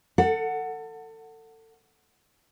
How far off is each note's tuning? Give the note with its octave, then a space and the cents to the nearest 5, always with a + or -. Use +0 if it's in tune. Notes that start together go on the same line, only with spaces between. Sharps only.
A4 +30 F#5 +0